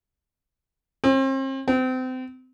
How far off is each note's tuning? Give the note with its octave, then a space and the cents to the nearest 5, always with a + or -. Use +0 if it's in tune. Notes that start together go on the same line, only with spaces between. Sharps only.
C4 +40
C4 -30